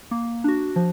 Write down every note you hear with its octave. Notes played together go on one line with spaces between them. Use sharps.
A#3
D4 F#4
F3